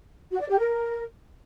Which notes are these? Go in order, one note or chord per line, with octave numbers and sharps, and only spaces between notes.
F#4
D5
G4
A#4